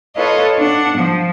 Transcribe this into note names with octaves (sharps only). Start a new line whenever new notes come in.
F4 A4 B4 C#5 D#5
D4 F#5
F3